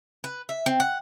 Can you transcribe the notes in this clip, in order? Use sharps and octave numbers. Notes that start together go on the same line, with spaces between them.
B4
E5
C4
F#5